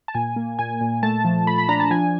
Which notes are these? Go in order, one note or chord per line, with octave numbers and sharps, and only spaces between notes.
A5
A#2 G#5
A#3
A#2 G#5
A#2
A3 A5
F3
A3 B5
B5
D4 A#5
A5
F3 G#5